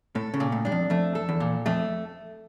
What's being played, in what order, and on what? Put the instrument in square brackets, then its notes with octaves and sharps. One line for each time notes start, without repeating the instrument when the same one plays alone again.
[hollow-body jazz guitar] A2 [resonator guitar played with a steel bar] A4
[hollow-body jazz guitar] C#3
[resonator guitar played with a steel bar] A#2
[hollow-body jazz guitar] A2
[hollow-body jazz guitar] G2 [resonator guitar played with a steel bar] D4
[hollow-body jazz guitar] F2
[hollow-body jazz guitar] F2 [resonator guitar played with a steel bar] A3
[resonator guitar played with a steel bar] A4
[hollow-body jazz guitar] E2
[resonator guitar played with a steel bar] A#2
[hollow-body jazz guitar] F2 [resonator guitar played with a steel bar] A3